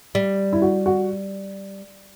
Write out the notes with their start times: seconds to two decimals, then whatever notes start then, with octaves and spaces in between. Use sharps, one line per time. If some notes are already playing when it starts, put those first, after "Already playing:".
0.15 G3
0.53 E4
0.62 F#4
0.86 F#4